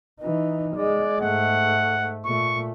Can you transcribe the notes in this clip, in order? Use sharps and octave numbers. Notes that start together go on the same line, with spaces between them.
E3 D#4
G#3 D5
G#2 A3 F#5
A#2 A3 C#6